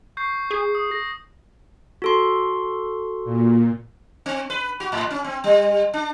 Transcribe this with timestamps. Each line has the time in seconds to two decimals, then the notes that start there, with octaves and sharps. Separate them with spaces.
0.17 C#6 G6 C7
0.51 G#4
0.75 D#6
0.91 A#6
2.02 F#4 A4 C6
3.24 A#2
4.26 C4
4.50 B4
4.80 F#4
4.92 G#2
5.11 C#4
5.24 C4
5.44 G3
5.94 D4